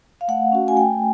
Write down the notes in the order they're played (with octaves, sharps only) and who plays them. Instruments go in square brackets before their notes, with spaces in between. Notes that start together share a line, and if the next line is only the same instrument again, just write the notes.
[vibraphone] F5
A3 F#5
C#4 F#4
G#5
A3 G5